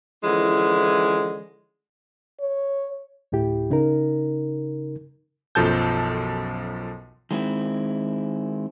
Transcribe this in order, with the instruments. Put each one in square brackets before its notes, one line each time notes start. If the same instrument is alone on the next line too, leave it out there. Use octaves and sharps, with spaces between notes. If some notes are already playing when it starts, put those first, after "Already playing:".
[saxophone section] D3 E3 F3 G#3 C#4 E4
[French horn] C#5
[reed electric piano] D2 A2 E4 G4
C#3 D#4 A#4
[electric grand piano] B1 F#2 F3 A4 A5 G6
[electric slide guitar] D#3 G#3 C4 E4